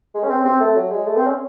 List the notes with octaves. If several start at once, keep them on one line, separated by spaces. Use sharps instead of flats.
G#3
C#4
C4
C4
A3
F#3
G#3
A3
C4
C#4